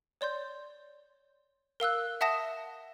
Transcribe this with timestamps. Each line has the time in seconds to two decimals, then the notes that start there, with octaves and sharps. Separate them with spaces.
0.21 C#5 D5 C6 G6
1.80 A#4 F5 E6 F#6
2.21 E5 F#5 A5 D#6 A#6 E7